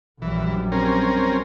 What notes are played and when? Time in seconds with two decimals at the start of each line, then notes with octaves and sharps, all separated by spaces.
0.22 A#1 F#2 E3 G3
0.72 C4 C#4 A#4